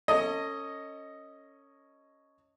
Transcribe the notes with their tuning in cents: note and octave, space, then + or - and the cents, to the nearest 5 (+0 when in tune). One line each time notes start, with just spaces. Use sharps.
C#4 +0 A4 +35 D#5 +0